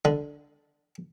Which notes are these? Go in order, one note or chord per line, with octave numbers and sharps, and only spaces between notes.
D3